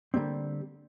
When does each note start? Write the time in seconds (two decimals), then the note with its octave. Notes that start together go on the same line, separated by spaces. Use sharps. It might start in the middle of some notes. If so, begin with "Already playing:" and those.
0.14 D3 D#3 G3 A#3 C4